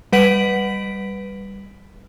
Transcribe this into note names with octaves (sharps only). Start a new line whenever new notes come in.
G3 B4 F#5 B6 D7 F#7